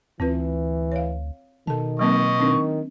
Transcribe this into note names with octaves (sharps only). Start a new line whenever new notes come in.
D2 E3 C4 F4 B4
C#5 F5
B2 D#3 A4 A5
F#3 A#3 C4 D#5 C#6
D#3 C4 D4